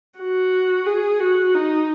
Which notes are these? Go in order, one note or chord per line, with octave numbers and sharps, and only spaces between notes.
F#4
G#4
F#4
D#4